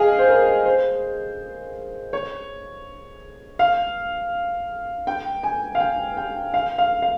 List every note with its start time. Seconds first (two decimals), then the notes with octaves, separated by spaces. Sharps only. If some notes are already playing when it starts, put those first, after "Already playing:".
Already playing: G#4 D#5 F5 G5
0.18 C5
0.29 A#4
0.65 C5
2.13 C#5
3.59 F5
5.07 G5
5.43 G#5
5.75 F5
5.80 G5
6.17 G5
6.54 F5
6.78 F5
7.02 F5